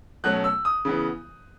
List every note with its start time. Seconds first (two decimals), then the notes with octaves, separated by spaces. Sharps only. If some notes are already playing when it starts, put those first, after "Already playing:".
0.24 B2 F#3 A3 C#4 F#6
0.44 E6
0.65 D#6
0.85 C#3 E3 B3